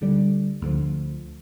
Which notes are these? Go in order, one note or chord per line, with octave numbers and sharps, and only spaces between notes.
D2 D3 G3
D2 D3 F3